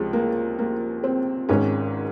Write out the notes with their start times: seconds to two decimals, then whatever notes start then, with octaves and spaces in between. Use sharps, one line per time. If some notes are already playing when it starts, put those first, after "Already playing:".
Already playing: C#2 C3 F3 G#3
0.13 A#3
0.59 A#3
1.04 C4
1.49 G#1 G#2 D#3 C#4